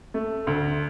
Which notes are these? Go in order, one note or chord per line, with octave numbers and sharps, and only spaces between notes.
A3
D2